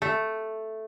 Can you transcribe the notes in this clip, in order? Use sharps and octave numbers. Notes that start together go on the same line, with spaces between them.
A3